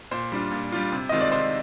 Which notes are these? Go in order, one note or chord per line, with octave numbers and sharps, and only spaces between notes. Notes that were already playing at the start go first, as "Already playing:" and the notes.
A#2 C5
G3 D4 F4
A#2
G3 D4 F4
C3
D#3 G#3 C4 F4 D#5
D5
C3 C5